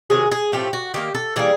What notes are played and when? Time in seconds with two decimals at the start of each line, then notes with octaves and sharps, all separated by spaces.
0.10 C3 D#3 F#3 G#4
0.32 G#4
0.52 A2 F3 A3 C4 G4
0.73 F#4
0.94 D#3 F#3 A#3 G4
1.15 A4
1.36 E3 G3 A#3 G#4